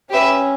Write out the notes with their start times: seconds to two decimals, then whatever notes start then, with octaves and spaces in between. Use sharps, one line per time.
0.11 C#4 G4 B4 E5